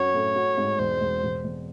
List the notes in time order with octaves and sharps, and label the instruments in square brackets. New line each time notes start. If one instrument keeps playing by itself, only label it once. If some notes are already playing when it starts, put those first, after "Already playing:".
Already playing: [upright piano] F#2 F#4 [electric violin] C#5
[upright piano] A2
F#4
G#2
[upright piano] E1 [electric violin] C5
[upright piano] E1
E1
E1